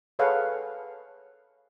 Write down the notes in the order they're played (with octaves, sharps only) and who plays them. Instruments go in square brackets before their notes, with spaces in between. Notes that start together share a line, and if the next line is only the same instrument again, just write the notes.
[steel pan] G#4 A4 B4 C#5 F5 F#5